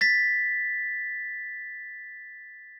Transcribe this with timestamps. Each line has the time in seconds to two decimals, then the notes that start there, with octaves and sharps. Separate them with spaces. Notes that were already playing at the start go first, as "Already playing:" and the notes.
0.01 A6 B6